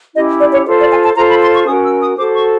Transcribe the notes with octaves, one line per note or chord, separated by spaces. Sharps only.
C#4 E4 G4 D#5
D5
C#5
F4 A4 C5 C#5
D5
G#5
A5
F4 A4 C5 A#5
B5
C6
C#6
C#4 F#4 A#4 D#6
E6
D#6
F#4 A4 C5 D6
C#6